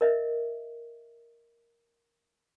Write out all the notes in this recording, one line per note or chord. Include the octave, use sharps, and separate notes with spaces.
A#4 D#5 E5